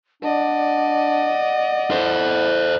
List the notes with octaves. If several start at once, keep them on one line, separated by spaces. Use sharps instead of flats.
D4 D5 D#5 F#5
E4 A4 C5